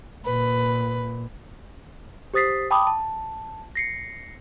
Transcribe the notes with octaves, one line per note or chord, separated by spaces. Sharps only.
A#2 B4
G4 C5 D#6 A6 B6 C7
G5 A5 B5 D6 D#6
A5
A#6 C7 C#7